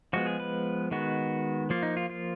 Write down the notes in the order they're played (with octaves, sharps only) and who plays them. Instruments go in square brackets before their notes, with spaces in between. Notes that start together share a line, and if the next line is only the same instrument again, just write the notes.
[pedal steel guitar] F3 G#3 B3 F#4
G#4
B4
D#3 G#3 B3 F#4
F3 A#3 F4
D#4
F4
F4